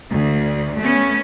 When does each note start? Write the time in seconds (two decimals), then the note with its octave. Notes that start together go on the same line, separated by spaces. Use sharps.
0.11 D2
0.80 A3 B3 C#4